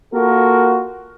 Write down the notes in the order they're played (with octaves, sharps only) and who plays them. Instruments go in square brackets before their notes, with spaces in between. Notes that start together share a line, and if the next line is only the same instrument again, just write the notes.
[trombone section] A#3 F4 F#4 A4 A#4